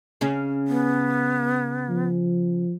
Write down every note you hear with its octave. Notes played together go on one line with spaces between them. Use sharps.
C#3 C#4
B3
F3